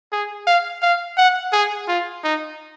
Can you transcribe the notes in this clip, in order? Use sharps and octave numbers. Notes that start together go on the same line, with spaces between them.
G#4
F5
F5
F#5
G#4
F4
D#4